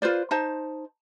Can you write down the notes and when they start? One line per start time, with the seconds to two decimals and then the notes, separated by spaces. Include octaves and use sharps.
0.02 F4 B4 C5 D5
0.31 D#4 C5 A5